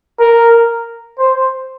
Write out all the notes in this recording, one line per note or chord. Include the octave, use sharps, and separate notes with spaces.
A#4
C5